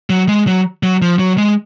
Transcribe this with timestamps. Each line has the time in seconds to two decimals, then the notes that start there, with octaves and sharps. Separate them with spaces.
0.10 F#3
0.28 G#3
0.47 F#3
0.83 F#3
1.02 F3
1.19 F#3
1.38 G#3